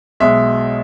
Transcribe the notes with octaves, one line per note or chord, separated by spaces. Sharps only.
B1 B2 G#3 E5